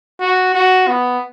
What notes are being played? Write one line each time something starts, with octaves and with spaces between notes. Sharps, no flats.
F#4
F#4
B3